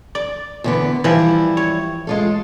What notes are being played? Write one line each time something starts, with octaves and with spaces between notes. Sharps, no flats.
D5
E2 D3 B3
E3 F3 G3 E4
C#5
G#3 F4 A4